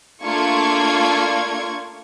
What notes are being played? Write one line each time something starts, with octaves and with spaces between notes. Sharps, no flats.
A3 A#3 D4 F4 C#6 G#6